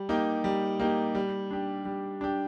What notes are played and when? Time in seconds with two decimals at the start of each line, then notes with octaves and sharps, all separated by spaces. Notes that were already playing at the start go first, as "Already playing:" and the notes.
Already playing: G3
0.09 A#3 D#4 G4
0.44 G3
0.80 A#3 D#4 G4
1.15 G3
1.51 D4 G4
1.85 G3
2.21 D4 G4